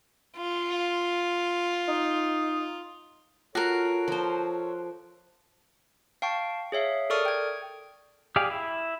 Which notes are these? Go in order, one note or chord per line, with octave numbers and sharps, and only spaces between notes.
F4
D#4
F4 F#4 A4 A#4 C#5 F#6
F3 C5
F5 G5 A5 C#6
G#4 C#5 E5 F5
A4 A#4 D5 C#6 D#6 F6
G5 G#6
G4 G#4 D5 F5
E4